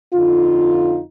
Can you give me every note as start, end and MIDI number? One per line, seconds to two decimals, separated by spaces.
0.14 1.00 41
0.14 1.00 50
0.14 1.00 63
0.14 1.00 65